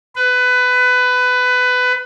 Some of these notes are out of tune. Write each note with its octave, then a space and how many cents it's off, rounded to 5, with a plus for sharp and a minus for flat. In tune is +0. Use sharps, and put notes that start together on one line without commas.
B4 +20